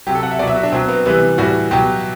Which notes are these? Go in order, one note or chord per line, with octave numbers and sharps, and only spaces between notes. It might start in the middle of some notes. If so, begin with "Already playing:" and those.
C3 F#3 G4
A4
F#5
E5
B2 F#3 D5
E5
F#4
D4
B2 F#3 C4
B3
C3 E3 G3 B3
A2 E3 G3 F#4
B2 F#3 G4